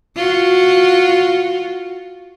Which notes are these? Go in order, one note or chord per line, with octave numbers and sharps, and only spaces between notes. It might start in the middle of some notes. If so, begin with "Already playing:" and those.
F4 F#4